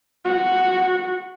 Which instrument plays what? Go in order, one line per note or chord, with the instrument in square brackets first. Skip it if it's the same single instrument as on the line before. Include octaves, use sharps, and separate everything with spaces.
[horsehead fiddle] F#4